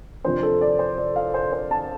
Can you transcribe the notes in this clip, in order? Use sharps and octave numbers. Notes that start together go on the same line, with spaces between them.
F2 C3 F3 D4 C5
A4
D5
C5
D5
F5
C5
C5
A5